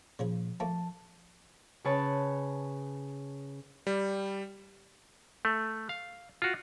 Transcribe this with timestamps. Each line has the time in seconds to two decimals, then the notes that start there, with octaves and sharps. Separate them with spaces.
0.19 A#2 C#3 F3 G#4
0.60 F3 A3 A#3 A5
1.84 C#3 B4 C#5 A5 B5
3.87 G3
5.45 A3
5.89 F5
6.42 F4 F#4